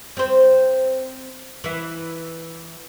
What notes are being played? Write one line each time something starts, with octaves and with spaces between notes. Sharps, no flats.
C4 C5
E3 E4